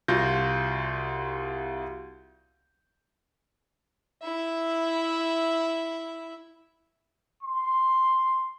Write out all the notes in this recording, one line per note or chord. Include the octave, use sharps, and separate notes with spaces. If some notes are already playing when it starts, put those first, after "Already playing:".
C2 F4 F#4 G6 A#6
E4 E5
C6